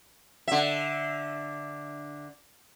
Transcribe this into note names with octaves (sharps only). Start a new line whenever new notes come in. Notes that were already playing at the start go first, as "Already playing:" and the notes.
D3 E5